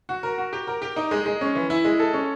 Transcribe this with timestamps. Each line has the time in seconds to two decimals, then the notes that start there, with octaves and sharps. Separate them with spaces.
0.09 F#4
0.23 A#4
0.38 F#4
0.53 G4
0.67 A#4
0.82 G4
0.96 D#4
1.11 G#3
1.26 G#3
1.41 C#4
1.55 E3
1.70 E4
1.85 G#3
2.00 A4
2.13 C#4